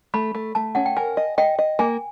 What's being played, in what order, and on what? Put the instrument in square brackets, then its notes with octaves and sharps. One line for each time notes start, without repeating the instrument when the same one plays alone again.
[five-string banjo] A3 [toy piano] B5
[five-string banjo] A3
[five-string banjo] A3 [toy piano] A5
[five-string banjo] C#4 [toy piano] F#5
[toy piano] G5
[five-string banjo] A#4 [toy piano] G#5
[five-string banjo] D#5
[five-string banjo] D#5 [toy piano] G5
[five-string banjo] D#5
[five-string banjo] A#3 [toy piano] G#5